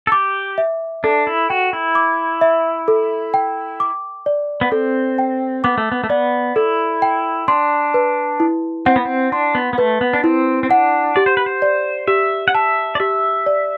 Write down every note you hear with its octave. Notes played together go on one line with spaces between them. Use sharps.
A4
G4 D6
E5
D4 A4
E4
F#4 G5
E4
D6
E5
A4
G5
D6
D5
B3
C4 A4
G5
B3 D6
A3
B3
A3
B3 D5
E4 A4
G5
D4 C6
B4
E4
C4 F#5
B3
C4
D4 C6
B3
B3
A3 B4
B3
D4
C4 E4
C4
D4 F#5
G4 D5
C5
B4
C5
D5
G4 E5
F#5
E5 A5
D5
G4 E5
D5